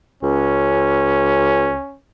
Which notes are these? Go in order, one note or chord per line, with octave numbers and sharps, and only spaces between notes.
C#2 C#4